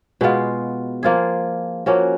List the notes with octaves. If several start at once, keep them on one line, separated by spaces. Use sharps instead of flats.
B2 G#3 B3 F4
F3 A#3 F4 G#4
F3 A#3 C#4 F#4